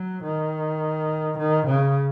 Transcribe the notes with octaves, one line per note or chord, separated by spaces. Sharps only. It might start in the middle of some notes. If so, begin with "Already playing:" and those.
Already playing: F#3
D#3
D#3
C#3